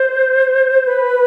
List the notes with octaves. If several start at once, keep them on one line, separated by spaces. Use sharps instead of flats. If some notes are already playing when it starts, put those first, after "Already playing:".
Already playing: C5
B4